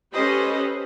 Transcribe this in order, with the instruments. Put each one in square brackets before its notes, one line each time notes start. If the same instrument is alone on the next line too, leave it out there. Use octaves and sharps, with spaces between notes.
[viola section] C#4 G4 A4 B4 C5 D#5